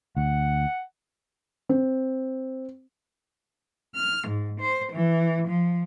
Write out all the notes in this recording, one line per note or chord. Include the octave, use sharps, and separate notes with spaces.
D2 F#5
C4
F6
G#2
C5
E3
F3